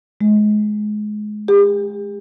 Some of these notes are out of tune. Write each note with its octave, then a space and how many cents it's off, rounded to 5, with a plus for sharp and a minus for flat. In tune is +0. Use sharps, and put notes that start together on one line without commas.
G#3 +25
G4 +45